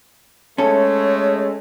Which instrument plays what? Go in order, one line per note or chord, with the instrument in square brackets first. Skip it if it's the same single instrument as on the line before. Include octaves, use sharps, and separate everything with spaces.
[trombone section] G#3 A3 [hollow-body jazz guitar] C#4 A4 [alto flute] C#5